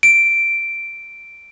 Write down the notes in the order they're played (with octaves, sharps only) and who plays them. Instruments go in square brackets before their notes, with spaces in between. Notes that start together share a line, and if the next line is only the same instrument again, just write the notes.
[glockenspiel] D7